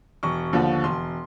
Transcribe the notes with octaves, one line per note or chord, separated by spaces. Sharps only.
E1 C#6
D#2 D3 F3
E1 C6